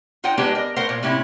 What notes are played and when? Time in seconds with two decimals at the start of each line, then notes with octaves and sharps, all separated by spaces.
0.24 D#4 F4 C5 F#5 G5
0.37 G#3 A#3 B3 D4 D#4 G4
0.55 A#4 D#5
0.76 A3 B3 A#4 C5 F5 F#5
0.89 A#2
1.03 A2 C3 A#3 C#4 E4